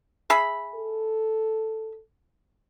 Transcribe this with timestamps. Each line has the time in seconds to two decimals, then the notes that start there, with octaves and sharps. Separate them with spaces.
0.30 G#4 E5 B5
0.75 A4